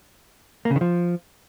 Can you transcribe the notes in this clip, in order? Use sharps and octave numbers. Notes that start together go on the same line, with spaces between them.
A#3
C#3
D#3
F3